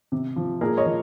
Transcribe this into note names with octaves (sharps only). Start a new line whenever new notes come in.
C3
F3
A#2 G#4 A#4
C#5 D#5
F3